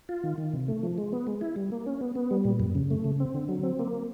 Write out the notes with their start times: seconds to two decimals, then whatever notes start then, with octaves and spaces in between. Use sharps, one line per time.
0.09 F4
0.23 D#3
0.38 D#3
0.53 C3
0.68 A3
0.83 F3
0.98 G#3
1.13 B3
1.27 G#3
1.41 E4
1.56 G3
1.72 A#3
1.86 C#4
2.01 B3
2.15 B3
2.31 G3
2.45 A#2
2.60 F#2
2.75 C#3
2.90 A3
3.04 C#3
3.20 C4
3.34 D3
3.49 F#3
3.63 C4
3.79 A#3